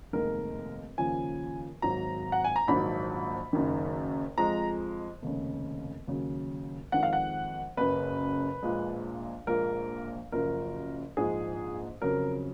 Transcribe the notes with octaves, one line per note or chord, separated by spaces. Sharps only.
F1 D#2 D#3 G#3 A#4
D#2 C#3 F3 G#5
G#1 G#2 F#3 A#5
F#5
G#5
A#5
A#1 G#2 D#3 F#3 B5
F#1 F#2 D#3
F2 F3 G#3 A#5
F1 D#2 C#3
D#2 C#3 F#3
F2 D#3 G#3 F#5
F5
F#5
F#1 F#2 C#3 B4
A#1 A#2 G#3
A#1 A#2 G#3 A#4
F#1 F#2 F3 A#4
A#1 G#2 F3 G#3 G#4
F2 C#3 F#3 A#4